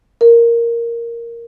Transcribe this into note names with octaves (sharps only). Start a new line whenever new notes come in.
A#4